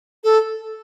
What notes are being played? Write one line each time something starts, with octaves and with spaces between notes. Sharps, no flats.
A4